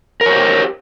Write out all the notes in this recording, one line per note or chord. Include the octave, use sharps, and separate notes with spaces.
G4 A#4 C5 C#5